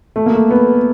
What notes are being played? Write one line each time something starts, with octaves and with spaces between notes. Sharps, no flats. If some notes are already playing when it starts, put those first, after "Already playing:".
A3
A#3
A3
B3